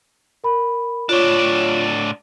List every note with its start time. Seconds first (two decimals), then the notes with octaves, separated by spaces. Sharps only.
0.44 A#4 B5
1.09 A2 D4 F4 C#5 D6